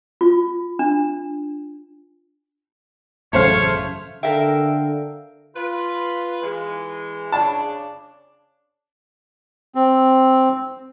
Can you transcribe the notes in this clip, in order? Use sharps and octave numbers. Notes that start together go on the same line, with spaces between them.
F4
D4
A1 F#2 C#3 A3 C5 C#5 F5
D3 A4 A#4 E5 F5 G5
F4 B4
E3 G#3
C#3 D4 A5
C4